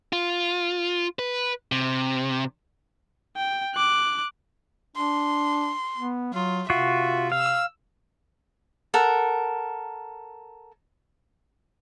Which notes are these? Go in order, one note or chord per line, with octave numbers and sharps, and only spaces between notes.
F4
B4
C3
G5
D6 F#6
D4 C6
B3
F#3 F4
C3 F4 F#4 E5
F5 E6
A4 A#4 F#5